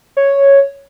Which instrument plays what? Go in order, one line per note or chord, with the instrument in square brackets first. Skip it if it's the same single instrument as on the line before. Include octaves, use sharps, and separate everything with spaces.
[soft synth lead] C#5